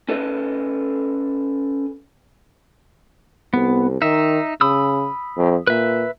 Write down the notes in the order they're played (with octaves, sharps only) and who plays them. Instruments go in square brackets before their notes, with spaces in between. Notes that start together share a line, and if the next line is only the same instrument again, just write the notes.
[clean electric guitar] C#4 A4 B4 D#5
[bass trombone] C2 [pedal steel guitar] B3
[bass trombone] D#3 [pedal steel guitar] D#4 E5
[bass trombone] C#3 [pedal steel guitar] B5 D#6 E6
[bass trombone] F2
[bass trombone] A#2 [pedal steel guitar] B4 E5